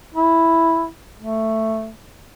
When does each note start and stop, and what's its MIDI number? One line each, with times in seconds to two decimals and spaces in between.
0.15 0.86 64
1.20 1.90 57